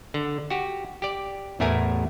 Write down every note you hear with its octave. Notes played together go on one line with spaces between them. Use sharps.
D3
F#4 G4
G4 D5
A1 E2 A3 E4 A#4 G#5